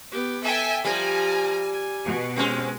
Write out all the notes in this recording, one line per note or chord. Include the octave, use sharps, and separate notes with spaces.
B3 G4
A4 E5 G5 G#5
F3 G3 G#5 A#5
G#5
B2
G#3 C4 C#4